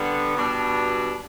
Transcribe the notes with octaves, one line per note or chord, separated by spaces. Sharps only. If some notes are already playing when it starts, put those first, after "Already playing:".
Already playing: D3 G3 B3
B2 G3 D4